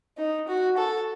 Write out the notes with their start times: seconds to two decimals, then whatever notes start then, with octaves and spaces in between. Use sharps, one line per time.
0.18 D#4
0.48 F#4
0.78 A4